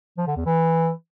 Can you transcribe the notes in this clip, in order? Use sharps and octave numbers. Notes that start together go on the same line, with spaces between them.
F3
D3
E2
E3